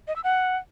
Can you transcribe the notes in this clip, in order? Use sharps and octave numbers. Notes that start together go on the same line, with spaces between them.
D#5
E6
F#5